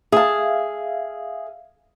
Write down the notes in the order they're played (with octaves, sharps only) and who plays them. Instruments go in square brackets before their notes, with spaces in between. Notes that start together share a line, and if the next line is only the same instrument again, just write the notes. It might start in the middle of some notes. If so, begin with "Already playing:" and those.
[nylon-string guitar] G#4 A5 [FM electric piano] E5 F5